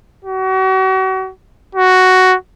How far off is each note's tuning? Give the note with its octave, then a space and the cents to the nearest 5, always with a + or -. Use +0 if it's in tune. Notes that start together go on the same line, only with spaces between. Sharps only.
F#4 +35
F#4 +5